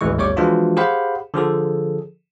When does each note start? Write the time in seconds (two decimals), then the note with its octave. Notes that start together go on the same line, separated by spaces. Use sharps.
0.01 G#1 D2 E3 G#3 C#6
0.17 G1 D2 G3 C#5 C#6 D6
0.37 E3 F3 G#3 D4 F4 F#4
0.77 G4 G#4 C5 F5 F#5 B5
1.34 D3 F3 G#4 A4